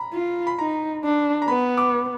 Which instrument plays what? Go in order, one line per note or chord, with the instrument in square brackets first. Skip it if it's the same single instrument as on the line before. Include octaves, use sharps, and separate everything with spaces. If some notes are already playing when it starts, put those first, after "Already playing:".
Already playing: [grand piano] A#5 B5
[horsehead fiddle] F4
[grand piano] B5
[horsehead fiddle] D#4 [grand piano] A#5
[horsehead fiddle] D4
[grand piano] A#5
[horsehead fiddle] B3 [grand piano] B5
[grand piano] D6